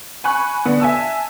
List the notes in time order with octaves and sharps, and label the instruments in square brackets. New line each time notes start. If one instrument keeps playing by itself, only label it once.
[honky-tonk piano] G#5 B5 C#6 F#6
D3 B3
E5 G#5 A5 E6